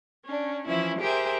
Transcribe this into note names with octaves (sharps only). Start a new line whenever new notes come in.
C#4 D4
E3 F3 C#4 E4
G4 G#4 A#4 C5 E5